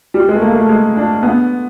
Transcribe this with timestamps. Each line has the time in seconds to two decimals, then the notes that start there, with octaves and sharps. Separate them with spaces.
0.14 G3
0.29 G#3
0.36 A3
0.42 A#3
0.55 A3
0.69 G#3
0.97 D4
1.23 B3